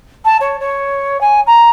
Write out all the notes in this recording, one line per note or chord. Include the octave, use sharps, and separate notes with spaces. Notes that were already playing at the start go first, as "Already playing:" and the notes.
A5
C#5
C#5
G#5
A#5